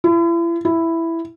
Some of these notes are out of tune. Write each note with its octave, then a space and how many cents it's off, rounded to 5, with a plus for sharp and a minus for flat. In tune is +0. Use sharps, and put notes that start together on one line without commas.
E4 +40
E4 +5